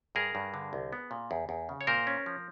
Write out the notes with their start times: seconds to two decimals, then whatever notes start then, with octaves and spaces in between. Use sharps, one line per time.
0.15 G2 G#4 A#4
0.35 G2
0.54 D3
0.73 C2
0.93 B3
1.11 A#2
1.31 E2
1.49 E2
1.69 C#3
1.81 C#5
1.87 A#2 A#4 C5
2.07 C#4
2.26 F3